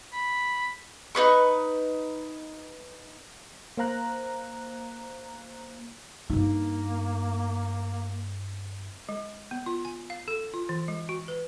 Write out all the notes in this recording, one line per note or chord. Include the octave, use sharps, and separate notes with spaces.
B5
D#4 G#4 B4 C#6
A#3 C5 F5 A#5 F#6
G2 A#3 D#4
G#3
B3
F4
G#5
F5
A4
F4
E3
G#3
F#4
B4